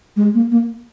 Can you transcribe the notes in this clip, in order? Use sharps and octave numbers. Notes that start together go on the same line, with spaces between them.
G#3
A#3
A#3